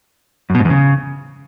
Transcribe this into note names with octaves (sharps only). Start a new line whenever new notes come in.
F#2
B2
G#2
E2
C#3